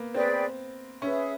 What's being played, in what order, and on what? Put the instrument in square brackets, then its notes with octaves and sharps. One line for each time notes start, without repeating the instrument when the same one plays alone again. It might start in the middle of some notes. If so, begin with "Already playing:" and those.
Already playing: [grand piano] A#3 B3
[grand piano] C4 [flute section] G#4 B4 D5 G5
[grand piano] C#4 [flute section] G#4 B4 E5